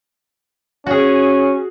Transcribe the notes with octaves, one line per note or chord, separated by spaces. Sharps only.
C#4 F#4 G#4